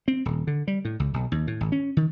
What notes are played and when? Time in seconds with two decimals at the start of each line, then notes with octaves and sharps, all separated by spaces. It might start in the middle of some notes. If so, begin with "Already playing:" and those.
0.08 C4
0.25 D#1
0.47 D3
0.68 G3
0.85 A2
1.00 C#2
1.14 B1
1.32 D#2
1.47 A2
1.61 G#1
1.72 C#4
1.97 D#3